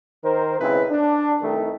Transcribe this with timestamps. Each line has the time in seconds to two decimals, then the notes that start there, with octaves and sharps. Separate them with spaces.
0.24 D#3 A#4 C5
0.61 B1 C#3 G#3 C4 E4 B4
0.91 D4
1.42 C2 D#3 A3